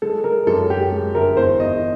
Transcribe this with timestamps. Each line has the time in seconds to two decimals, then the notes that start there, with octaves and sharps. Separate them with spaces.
0.02 G#3 A4
0.24 G#3 A#4
0.47 F#2 A4
0.70 G#3 G4
0.92 G#3
1.15 G1 A#4
1.37 E2 C5
1.60 E2 D#5